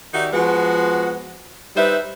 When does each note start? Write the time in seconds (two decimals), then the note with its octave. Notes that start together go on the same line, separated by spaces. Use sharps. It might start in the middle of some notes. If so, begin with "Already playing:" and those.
0.14 D#3 D#4 F#4 G4 D5 E5
0.33 F3 G#3 B3 F#4
1.76 G3 D#4 B4 C5 E5